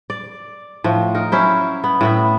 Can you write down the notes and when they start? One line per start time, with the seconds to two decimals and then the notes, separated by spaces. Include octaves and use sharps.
0.10 D5
0.84 A2 F3
1.14 D#4 A#4
1.32 F#3 C#4 E4 C5
1.84 B3
2.01 A2 B3 E5